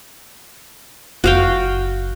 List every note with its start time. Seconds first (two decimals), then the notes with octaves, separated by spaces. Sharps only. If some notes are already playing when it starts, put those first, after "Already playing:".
1.24 F#1 F#4 F5 G5